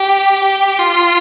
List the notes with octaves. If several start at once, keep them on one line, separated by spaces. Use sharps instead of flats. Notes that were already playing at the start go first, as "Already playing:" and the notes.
Already playing: G4
G4
F4